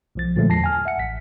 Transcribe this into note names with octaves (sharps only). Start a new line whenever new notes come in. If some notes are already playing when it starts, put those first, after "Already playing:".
B1 F3 A6
A#2 D3 F3 F#3 G#3 A3
E2 A5 A#6 C7
G#5 F6
E5 F#5 C#7
A1 B6